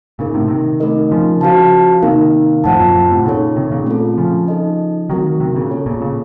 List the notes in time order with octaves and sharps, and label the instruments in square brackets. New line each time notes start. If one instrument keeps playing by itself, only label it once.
[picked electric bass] A#2 C#3 [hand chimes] A#3 D#4 A#4
[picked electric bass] A2 C3
C3 D#3
[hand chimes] A3 C4 D#4 A#4 D#5
[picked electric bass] C#3 F3
[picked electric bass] C#3 F3 [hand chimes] F#4 C5 F5 A5
[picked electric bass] C3 D#3 [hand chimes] A#3 D#4 A#4 F5
[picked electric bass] F2 A2 [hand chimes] F4 C5 F#5 A5
[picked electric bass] F#2 A#2
C3
F#2 A#2
A2 C3
[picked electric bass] A#2 C#3 [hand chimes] D#4 A4 C#5
[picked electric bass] C3 D#3
A#2 C#3
[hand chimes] A3 C4 F4 A4
[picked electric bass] C#3 F3
[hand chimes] D#4 A4 D#5
[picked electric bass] D#3 F#3 [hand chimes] A3 C4 F#4 A#4
[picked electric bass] C3 D#3
A#2 C#3
[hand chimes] A#3 C#4 A4 C#5
[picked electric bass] A#2 C#3
A#2 C#3